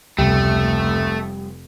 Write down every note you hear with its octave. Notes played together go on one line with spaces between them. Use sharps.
F1 C#2 C3 G3 A3 B3 G4 G5